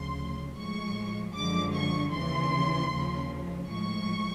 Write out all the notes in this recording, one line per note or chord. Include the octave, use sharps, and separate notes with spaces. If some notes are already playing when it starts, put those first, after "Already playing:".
Already playing: D2 C#3 F3 C6
A2 F3 G#3 C#6
F#2 D3 F3 G#3 D6
C#6
D#2 C#3 E3 C6
D#2 C#3 F3
A2 F3 G#3 C#6